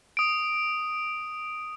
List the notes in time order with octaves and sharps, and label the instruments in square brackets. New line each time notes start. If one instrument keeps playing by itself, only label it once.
[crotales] D#6 D7